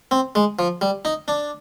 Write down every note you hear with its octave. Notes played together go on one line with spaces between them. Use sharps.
C4
G#3
F3
G3
D#4
D4